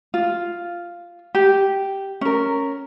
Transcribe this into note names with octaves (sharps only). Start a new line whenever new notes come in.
F4
G4
C#4 A#4